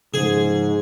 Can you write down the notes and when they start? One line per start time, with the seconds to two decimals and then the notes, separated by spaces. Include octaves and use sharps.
0.14 G#2 C#3 F3 G#4